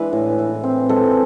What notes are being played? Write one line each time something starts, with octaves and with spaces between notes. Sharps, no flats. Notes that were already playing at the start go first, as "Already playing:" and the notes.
Already playing: E3 G#3 D4 B4
A2
E3
C4
G#3 A4